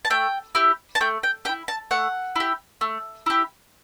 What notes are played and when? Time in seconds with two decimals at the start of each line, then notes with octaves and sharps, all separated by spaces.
0.05 A5
0.10 A3 G5
0.55 E4 G4
0.95 A5
1.01 A3 G5
1.23 G5
1.45 G4 G5
1.49 E4
1.68 A5
1.91 A3 F#5
2.36 E4 G4
2.81 A3
3.26 E4 G4